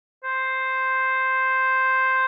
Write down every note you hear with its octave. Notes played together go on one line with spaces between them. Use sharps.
C5